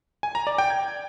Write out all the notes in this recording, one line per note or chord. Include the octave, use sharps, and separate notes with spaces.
G#5
A#5
D5
G5
G#6